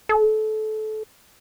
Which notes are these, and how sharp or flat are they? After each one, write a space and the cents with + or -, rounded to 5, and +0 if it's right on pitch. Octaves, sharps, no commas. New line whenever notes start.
A4 -25